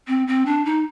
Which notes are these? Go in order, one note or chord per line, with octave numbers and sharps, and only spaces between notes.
C4
C4
D4
D#4